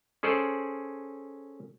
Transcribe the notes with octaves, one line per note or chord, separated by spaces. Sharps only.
C#4 G#4 A4 C5 D5